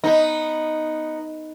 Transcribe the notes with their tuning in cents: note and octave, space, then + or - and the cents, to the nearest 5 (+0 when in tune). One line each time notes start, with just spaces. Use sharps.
B3 +0 D#4 +0